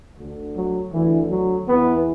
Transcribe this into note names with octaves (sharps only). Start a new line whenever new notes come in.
D2 D3
F#3
D2 D3 E3
F#3
E2 E3 B3